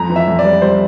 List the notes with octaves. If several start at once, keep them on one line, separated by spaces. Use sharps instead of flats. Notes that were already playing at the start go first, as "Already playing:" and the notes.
Already playing: F2 A#5
E3
E5
F2
D5
G3
G3 C5